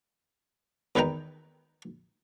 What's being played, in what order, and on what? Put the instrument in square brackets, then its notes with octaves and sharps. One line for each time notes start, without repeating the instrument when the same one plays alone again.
[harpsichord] E2 D#3 B4 G5 A#5